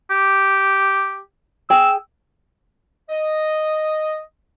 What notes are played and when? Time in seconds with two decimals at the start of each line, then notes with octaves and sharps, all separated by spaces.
0.11 G4
1.70 G#4 G5 E6
3.09 D#5